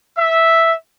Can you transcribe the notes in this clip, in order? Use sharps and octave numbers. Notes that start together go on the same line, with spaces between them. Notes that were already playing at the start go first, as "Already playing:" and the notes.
E5